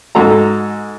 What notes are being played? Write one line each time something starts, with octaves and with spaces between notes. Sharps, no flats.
G#2 F#4 A4 A#5